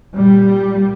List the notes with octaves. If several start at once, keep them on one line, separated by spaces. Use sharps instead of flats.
A#2 G3